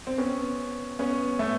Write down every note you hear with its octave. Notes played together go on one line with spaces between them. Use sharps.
C4
B3 C#4
B3 C#4
A3 B3